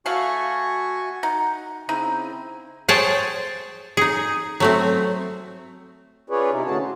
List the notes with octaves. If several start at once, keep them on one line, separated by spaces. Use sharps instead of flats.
A3 F#4 F5 F#5 G#5 C#6
D#4 F#5
C#3 C4 D#4 E4
G#4 C5 C#5 G5 A5
D#4 G#4
F#3 A3 C4
C#4 F4 G#4 B4 C#5 D5
C3 D#4 E4
A2 D3 C#4 F#4 G#4 A5
C5